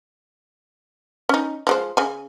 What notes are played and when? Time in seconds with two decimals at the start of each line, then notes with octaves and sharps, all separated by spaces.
1.29 C#4 D#4
1.67 F3 G#3 C5
1.97 C#3 G#5